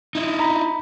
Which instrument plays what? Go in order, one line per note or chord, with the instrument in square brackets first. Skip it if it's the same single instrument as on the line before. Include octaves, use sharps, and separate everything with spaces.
[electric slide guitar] D#4 E4
[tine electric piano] A#5 B5